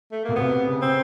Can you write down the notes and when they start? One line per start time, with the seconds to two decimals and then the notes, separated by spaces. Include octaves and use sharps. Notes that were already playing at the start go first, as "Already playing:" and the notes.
0.12 A3
0.25 B2 A#3
0.36 C3 B3
0.67 C#3
0.82 C4